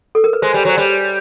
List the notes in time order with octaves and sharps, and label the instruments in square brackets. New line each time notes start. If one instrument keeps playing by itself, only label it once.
[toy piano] A4
A#4
B4
[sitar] G#3 [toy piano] C5
[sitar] G3
[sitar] F#3 [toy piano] C5
[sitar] G3 [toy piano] C#5